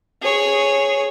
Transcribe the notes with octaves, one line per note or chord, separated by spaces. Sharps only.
G#4 C#5